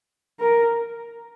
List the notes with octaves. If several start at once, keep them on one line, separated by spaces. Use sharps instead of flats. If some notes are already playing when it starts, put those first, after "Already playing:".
A#4